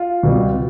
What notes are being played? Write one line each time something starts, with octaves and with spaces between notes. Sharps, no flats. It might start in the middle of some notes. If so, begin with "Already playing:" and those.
Already playing: F4
C#2 B2 G3 C4